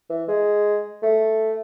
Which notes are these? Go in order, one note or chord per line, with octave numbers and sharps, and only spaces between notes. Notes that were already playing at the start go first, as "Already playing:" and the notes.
E3
G#3
A3